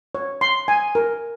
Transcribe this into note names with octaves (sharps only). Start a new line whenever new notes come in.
C#5
C6
G#5
A#4